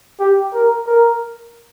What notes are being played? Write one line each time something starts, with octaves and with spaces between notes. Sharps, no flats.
G4
A#4
A#4